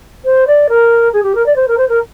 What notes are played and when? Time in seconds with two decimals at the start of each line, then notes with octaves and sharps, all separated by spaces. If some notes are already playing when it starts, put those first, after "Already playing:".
0.24 C5
0.47 D5
0.69 A#4
1.13 G#4
1.23 G4
1.35 A#4
1.46 D5
1.56 C5
1.68 A#4
1.77 C5
1.89 A#4